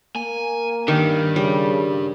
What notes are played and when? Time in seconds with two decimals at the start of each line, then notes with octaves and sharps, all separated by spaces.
0.16 A#3 G#5
0.88 D#3 D4 G4
1.36 C#3 G3